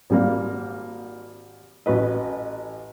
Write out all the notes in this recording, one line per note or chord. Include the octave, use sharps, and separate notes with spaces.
G#1 G3 A#3
A1 F#4 B4 D#5